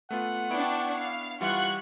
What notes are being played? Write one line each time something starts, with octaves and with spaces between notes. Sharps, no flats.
A3 B3 F4 F#5
B3 D4 E4 G5 C#6 D7
F5
E3 G3 E4 F4 F#5 C#6 F#6